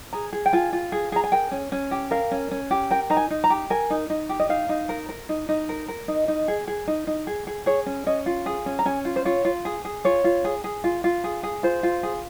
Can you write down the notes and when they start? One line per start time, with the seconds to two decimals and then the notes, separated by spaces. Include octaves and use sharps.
0.13 G#4 A#5
0.33 G#4
0.46 G5
0.53 F4 G#5
0.73 F4
0.92 G#4
1.12 G#4 A#5
1.24 G#5
1.32 A#4 G5
1.52 C#4
1.72 C#4
1.91 G4
2.11 A#4 F5
2.31 C#4
2.51 C#4
2.71 G4
2.91 A#4 G5
3.10 D#4 A#5
3.17 G#5
3.30 D#4
3.44 A#5
3.50 G4
3.70 A#4 G#5
3.90 D#4
4.10 D#4
4.29 G4
4.40 D#5
4.49 D#4 F5
4.69 D#4
4.89 A#4
5.09 A#4
5.29 D#4
5.49 D#4
5.69 A#4
5.88 A#4
6.08 D#4 D#5
6.28 D#4
6.48 G#4
6.68 G#4
6.88 D#4
7.07 D#4
7.27 G#4
7.47 G#4
7.66 G#4 C#5
7.86 C#4
8.06 C#4 D#5
8.26 F4
8.46 G#4
8.66 C#4
8.79 A#5
8.86 C#4 G#5
9.05 F4
9.16 C5
9.25 F4 C#5
9.45 F4
9.65 G#4
9.85 G#4
10.05 F4 C#5
10.24 F4
10.45 G#4
10.64 G#4
10.84 F4
11.04 F4
11.24 G#4
11.43 G#4
11.63 F4 C5
11.83 F4
12.03 G#4